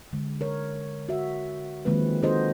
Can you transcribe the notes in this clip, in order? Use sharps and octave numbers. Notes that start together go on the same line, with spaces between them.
D3 G#3
A#4 C#5
F#4 E5
D#3 F3 G#3 A#3 C4 B4
C4 D#4 F#4 A4 C5 D#5